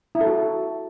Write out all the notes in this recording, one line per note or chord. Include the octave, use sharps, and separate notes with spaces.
E4
A4
F#4